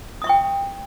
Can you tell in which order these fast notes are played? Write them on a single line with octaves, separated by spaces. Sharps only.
D#6 E5 C#6 G5